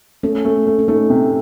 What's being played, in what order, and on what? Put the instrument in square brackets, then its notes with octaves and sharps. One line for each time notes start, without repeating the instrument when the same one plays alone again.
[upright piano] A3 [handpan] C#4
[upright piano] A3
A3
[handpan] C#4
[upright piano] A3 [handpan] D#4
[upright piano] C3